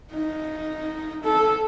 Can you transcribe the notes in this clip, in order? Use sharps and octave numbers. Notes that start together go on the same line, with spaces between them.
D#4
A4